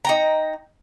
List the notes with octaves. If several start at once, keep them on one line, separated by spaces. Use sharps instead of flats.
D#4 G5 A#5